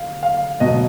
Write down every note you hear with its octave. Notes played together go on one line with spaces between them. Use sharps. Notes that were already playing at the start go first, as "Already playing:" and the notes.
Already playing: F5
F5
B2 F#3 D#5